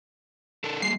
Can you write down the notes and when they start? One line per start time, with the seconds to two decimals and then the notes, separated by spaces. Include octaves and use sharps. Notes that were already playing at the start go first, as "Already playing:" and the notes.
0.64 D4 A4 A#4
0.82 G3 G#3 A#3 C7